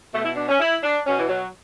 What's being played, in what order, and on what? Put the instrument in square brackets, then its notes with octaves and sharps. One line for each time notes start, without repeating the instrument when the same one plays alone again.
[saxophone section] B2 A3
E4
D4
C#4
E4
D4
B2 C#4
E3
F#3